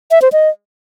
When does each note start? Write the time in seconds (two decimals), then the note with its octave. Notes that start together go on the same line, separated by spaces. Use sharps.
0.11 E5
0.22 C5
0.32 D#5